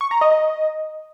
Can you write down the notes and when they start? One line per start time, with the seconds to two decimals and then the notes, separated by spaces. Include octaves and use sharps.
0.01 C#6
0.11 A#5
0.21 D#5
0.32 D#5